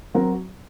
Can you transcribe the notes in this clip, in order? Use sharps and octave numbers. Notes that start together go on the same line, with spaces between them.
F#3 C4 F#4 A#4